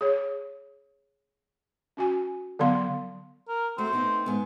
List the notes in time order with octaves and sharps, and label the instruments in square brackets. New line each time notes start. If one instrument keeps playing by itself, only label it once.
[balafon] G#4 C#5
C#4 F#4 G#5
D3 F#3 B3 F5 C6
[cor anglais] A#4
[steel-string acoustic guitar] A3 F#4 [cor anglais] C4
[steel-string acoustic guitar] B3 D#4
G#2 B3